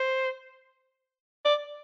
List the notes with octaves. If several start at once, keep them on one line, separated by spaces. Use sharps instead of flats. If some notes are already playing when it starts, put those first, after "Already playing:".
Already playing: C5
D5